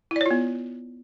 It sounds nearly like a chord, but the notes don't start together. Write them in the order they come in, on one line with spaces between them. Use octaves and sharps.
E4 D5 C#5 F4 B3